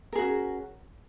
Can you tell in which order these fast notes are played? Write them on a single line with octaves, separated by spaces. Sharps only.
A#4 G#4 F#4 C#4